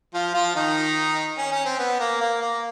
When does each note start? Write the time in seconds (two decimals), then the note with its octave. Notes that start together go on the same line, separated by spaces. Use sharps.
0.14 F3 F4
0.34 F3 F4
0.55 D#3 D#4
1.37 C#4
1.52 C#4
1.65 C4
1.79 B3
2.00 A#3
2.21 A#3
2.41 A#3